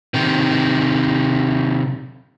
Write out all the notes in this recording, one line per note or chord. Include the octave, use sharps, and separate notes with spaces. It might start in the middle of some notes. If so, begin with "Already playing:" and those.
C3 D#3